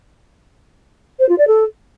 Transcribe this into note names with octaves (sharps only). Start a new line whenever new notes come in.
C5
F4
D5
A4